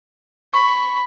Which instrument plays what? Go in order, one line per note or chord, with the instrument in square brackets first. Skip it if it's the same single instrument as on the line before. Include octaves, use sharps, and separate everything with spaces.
[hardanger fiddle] B5 [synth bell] C#6